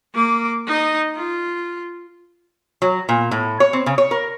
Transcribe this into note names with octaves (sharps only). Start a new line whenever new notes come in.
A#3 D6
D#4 D#5
F4
F#3
A#2
A2
C#5
C4
C#3
C#5
A#4